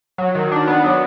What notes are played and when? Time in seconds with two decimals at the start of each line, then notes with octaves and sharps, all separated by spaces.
0.18 F#3
0.35 D#3
0.52 D4
0.67 B3
0.84 F#3